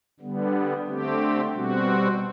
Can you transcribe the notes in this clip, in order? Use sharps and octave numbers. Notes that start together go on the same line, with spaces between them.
D3 G3 B3
D3 A3 C4 G4
B2 G3 C4 F#4